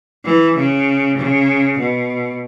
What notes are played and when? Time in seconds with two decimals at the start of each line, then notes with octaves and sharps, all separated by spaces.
0.25 E3
0.56 C#3
1.17 C#3
1.78 B2